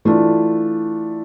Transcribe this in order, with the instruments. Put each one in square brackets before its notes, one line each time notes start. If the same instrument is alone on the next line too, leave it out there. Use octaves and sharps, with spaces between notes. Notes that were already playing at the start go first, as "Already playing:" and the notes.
[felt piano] E3 A3 D4 F4